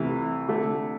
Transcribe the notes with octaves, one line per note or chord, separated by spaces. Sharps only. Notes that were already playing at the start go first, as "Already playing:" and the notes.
Already playing: C2 C3 E3 A3 E4
D3 A3 D4